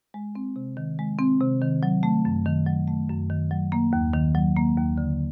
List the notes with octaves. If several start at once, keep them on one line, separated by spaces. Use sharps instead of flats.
G#3
C4
C3
D#3
G#3
C4
C3
D#3
F#3
A3
F#2
D#3
F#3
A3
F#2
D#3
F#3
A#3
D#2
D#3
F#3
A#3
D#2
D3